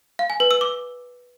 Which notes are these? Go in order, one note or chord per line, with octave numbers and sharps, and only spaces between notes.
F5
G#5
B4
E6
D6